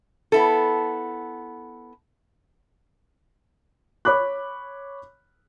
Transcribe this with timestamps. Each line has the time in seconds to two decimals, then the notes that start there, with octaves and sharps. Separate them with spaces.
0.32 B3 E4 A4
4.05 C#5 B5 D6 F#6